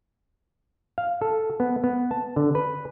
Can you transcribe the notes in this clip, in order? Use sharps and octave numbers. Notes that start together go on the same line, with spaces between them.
F5
A4
B3
B3
A5
D3
B4